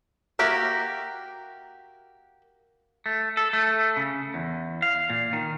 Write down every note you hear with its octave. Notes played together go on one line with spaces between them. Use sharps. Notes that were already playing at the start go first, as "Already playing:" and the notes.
A#3 F#4 G4 A#4 E5
A3
A4
A3
C#3
E2
F5
A#2
D#3